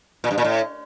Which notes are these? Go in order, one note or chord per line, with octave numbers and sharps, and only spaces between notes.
A#2
G2
A#2
A2